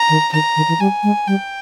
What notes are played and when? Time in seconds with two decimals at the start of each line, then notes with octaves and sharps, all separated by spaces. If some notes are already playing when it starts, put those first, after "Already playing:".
Already playing: A#5
0.09 D#3
0.33 D#3 A#5
0.56 D#3
0.68 E3
0.80 G3 G#5
1.03 G#3
1.27 G3 G5